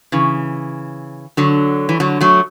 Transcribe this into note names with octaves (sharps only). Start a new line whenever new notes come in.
C#3 E3
D3 F#3
E3
D3 F#3
F#3 A3